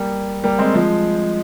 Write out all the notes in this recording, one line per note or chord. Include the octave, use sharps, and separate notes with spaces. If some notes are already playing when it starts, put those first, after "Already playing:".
Already playing: G3 A#3
G3 A#3
G#3 C4
F3 G#3